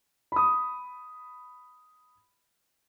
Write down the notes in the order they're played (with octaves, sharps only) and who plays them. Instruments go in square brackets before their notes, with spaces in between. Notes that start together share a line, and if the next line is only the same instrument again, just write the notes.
[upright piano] B5 D#6